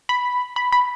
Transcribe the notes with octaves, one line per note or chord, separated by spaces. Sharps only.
B5
B5
B5